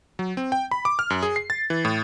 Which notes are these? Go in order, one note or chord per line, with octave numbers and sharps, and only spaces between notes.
F#3
C4
G5
B5
D6
F6
F#2
G#4
C7
A6
E3
A2